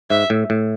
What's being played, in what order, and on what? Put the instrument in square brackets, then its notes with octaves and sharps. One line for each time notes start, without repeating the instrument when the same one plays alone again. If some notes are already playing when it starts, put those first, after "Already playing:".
[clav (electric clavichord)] G#2 [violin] E5
[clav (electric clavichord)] A2
A2